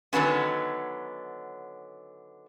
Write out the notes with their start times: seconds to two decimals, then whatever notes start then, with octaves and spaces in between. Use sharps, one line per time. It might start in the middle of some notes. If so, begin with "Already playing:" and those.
0.13 D3 D#3 F#3 B3 C#4